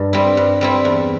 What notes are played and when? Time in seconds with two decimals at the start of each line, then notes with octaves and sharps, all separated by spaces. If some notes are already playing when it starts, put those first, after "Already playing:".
Already playing: G2
0.13 G3 C4 E4
0.37 G2
0.61 G3 C4 E4
0.85 E2